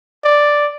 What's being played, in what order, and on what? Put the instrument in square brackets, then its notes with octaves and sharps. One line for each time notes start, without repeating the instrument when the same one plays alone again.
[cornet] D5